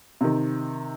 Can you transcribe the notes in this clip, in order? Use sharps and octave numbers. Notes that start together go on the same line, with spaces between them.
C3 D#3